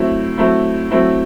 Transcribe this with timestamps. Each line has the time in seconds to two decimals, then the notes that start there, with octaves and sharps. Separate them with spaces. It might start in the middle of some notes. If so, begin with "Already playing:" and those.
Already playing: F#3 A3 C4 E4
0.38 F#3 A3 C4 E4
0.91 F#3 A3 C4 E4